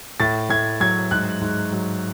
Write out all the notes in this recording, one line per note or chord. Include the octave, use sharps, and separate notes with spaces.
A2 A6
A2 G#6
F#3 G#6
G#2 F#6
G#2
F#3